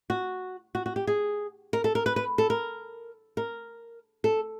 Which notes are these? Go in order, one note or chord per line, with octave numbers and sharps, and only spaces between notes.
F#4
F#4
F#4
G4
G#4
A#4
A4
A#4
B4
B4
A4
A#4
A#4
A4